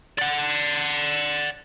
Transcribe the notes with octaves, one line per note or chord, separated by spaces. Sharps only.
D5 F#5